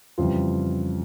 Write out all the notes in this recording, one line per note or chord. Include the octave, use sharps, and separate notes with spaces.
F2 C#3 E3 G3 F4